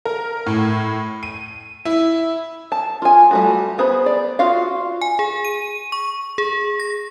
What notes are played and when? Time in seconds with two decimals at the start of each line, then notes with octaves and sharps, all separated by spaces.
0.05 A#4
0.46 A2
1.23 D#7
1.85 E4
2.72 A5
3.02 F4 G#5
3.31 G3 A3 F#4
3.78 B3 G#4 C5 B5
4.06 D5
4.39 F4 F#4 F5
5.01 G#5
5.19 G#4
5.45 D#7
5.92 C#6
6.38 G#4
6.80 A#6